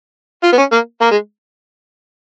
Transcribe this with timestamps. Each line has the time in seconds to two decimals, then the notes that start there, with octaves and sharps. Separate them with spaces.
0.43 F4
0.52 B3
0.57 C#4
0.72 A#3
1.01 A#3
1.11 G#3